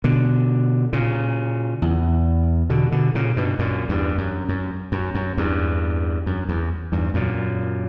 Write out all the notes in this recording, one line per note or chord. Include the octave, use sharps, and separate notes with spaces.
B2 D3
A#2 C#3
E2
B2 D3
B2 D3
A#2 C#3
G2 B2
F#2 A#2
E2 G2
F#2
F#2
F#2
F#2
E2 G2
F#2
E2
E2 G2
F#2 A#2